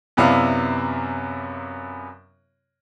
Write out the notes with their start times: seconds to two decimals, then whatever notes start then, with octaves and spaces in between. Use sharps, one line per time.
0.17 F#2 C3 B3 E4 D5 F5